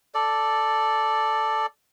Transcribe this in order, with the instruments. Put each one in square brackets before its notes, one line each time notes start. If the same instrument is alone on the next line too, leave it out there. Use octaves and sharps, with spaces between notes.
[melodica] A4 D5